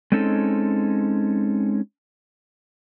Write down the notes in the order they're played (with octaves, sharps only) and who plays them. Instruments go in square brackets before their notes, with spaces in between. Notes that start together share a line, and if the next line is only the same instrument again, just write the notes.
[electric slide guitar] G#3 C4 C#4 D#4 A4